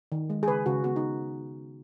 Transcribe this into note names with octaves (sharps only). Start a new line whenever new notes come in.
D#3
G#3
G#4
C#3 B4
C#3 F#4
B3 F#4
D#4